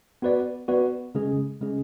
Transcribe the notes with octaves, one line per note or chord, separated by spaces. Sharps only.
B3 F#4 B4 D5
B3 F#4 B4 D5
C#3 G#3 C#4 G#4
C#3 G#3 C#4 G#4